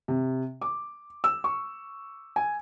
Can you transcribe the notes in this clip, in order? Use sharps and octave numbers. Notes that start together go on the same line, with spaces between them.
C3
D6
E6
C#6
G#5